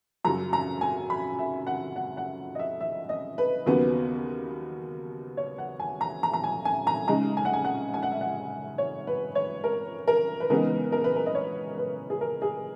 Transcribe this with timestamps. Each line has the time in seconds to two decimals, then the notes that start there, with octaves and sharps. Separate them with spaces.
0.25 F#2 C#3 F#3 A#5
0.53 A#5
0.81 G#5
1.10 B5
1.39 E5
1.67 F#5
1.96 F#5
2.17 F#5
2.55 D#5
2.59 E5
2.81 E5
3.09 D#5
3.38 B4
3.66 D#2 C#3 F#3 B3
5.37 C#5
5.58 F#5
5.80 G#5
6.01 A#5
6.23 A#5
6.33 A#5
6.44 G#5
6.65 G#5
6.87 A#5
7.08 C#3 G#3 D#4 A#5
7.37 G#5
7.45 F#5
7.53 G#5
7.65 F#5
7.94 G#5
8.03 F#5
8.11 E5
8.21 F#5
8.78 C#5
9.07 B4
9.35 C#5
9.64 A#4
10.08 A#4
10.40 B4
10.50 C#3 E3 G#3 B3 D#4 A#4
10.92 A#4
11.04 B4
11.16 A#4
11.26 D#5
11.35 C#5
11.78 B4
12.10 G#4
12.21 A#4
12.42 G#4